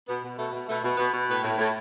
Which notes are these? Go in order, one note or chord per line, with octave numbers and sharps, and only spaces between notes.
B2 B3
B2
B2 A3
B2
B2 A3
B2
B2 B3
B2
A2 B3
A2
A2